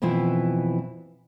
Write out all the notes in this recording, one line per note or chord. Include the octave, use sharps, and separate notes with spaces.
F2 B2 E3 E4 F4